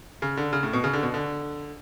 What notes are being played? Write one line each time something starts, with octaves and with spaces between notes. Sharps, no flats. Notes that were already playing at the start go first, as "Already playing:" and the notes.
C#3
D3
C#3
A2
B2
C#3
D3
B2
D3